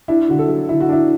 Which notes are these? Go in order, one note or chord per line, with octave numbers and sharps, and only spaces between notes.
D4 E4
D3 F#4
A4
F#3
D3 E4
F#4
D4 E4